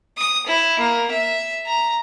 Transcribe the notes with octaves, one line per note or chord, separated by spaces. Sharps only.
D#6
E4
A#3
E5
A#5